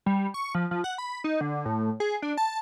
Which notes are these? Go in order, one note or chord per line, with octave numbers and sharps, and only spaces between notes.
G3
C#6
F3
F3
F#5
B5
D#4
D3
A2
G#4
D4
A5